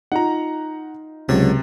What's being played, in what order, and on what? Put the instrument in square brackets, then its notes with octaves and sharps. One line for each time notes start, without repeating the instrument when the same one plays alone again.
[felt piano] D#4 F4 [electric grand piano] F#5 A#5
[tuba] C#2 [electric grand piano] C3 [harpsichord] F#3 C#5 A5